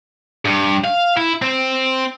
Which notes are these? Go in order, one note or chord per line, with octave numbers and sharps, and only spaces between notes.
G2
F5
E4
C4